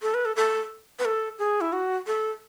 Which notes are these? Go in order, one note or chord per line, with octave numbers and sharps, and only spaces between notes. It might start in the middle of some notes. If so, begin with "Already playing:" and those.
A4
B4
A4
A4
B4
A4
G#4
E4
F#4
A4